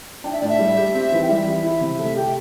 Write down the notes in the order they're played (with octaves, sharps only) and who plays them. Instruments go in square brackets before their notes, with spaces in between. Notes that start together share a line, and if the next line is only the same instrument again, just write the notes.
[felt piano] D4 [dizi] G5
[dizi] E5
[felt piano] A2 [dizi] D5
[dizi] E5
[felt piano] G3
G4
C4
E3
[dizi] G5
[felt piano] G3 [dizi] E5
[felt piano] E3
E4
C3
[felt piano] A3 [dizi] E5
[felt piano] G4 [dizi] G5